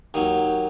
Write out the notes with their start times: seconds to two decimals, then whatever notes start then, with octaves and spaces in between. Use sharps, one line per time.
0.14 D#2 D#3 F#3